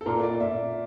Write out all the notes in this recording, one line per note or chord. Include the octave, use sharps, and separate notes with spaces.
A4
A#2 A#4
D5
A#2 E5